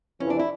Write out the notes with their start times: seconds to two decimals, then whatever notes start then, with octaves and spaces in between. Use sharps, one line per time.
0.20 F2 C3 E3 C#4
0.30 D4
0.39 E4